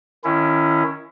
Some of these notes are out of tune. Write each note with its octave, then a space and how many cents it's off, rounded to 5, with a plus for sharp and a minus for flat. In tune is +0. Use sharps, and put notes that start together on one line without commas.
D#3 +0 C#4 +0 E4 +25